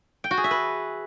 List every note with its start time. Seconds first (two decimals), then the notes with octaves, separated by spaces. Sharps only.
0.24 G5
0.31 F#4
0.37 G#4
0.44 E5
0.51 B4